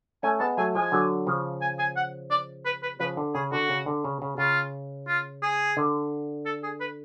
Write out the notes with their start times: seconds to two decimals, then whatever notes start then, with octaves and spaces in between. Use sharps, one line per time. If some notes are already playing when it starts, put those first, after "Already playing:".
0.23 A3 C#4 G#5
0.40 G#3 B3 A5
0.57 F#3 A3 G#5
0.75 F3 G#3 G#5
0.92 D3 F#3
1.26 C#3 F3
1.62 G#5
1.79 G#5
1.96 F#5
2.31 D5
2.65 B4
2.83 B4
3.00 C#3 F3 B4
3.17 D3
3.34 C#3 G#4
3.52 D3 F#4
3.69 C#3
3.86 D3
4.04 C#3
4.22 C#3
4.38 C#3 F4
5.08 F4
5.42 G#4
5.77 D3
6.46 A4
6.63 G#4
6.81 B4